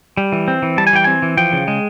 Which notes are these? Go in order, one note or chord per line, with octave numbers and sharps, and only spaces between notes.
G3
E3
C4
E3
G3 A5
G#5
E3 G5
C4 G#5
E3
F3 G5
C#3
G#3